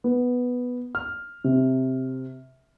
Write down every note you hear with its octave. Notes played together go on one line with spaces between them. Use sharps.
B3
F6
C3